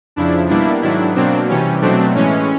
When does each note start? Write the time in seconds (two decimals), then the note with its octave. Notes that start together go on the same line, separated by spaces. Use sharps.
0.16 F2 C#3 F3 D4 E4
0.49 B2 G3 A#3 D4 E4
0.82 G#2 D#3 F#3 D4 E4
1.15 B2 F#3 A#3 C4 D4
1.48 C3 E3 G3 C#4
1.82 B2 F#3 A3 C4 D4
2.14 A2 E3 G#3 C#4